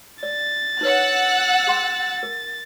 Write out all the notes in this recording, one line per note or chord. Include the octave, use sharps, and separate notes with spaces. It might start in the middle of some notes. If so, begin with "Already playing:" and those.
D5 A6
D#4 B4 C#5 F#5 E6 F#6
G#4 G5 C6
A#4